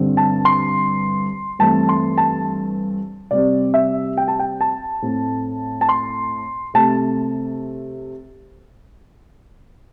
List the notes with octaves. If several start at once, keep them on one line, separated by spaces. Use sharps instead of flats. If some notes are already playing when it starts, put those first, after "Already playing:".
Already playing: G2 D3 C4
A5
C6
G2 E3 A3 C4 A5
C6
A5
C3 G3 C4 D5
E5
G5
A5
G5
A5
A2 A3 C4
A5
C6
C3 A3 C4 A5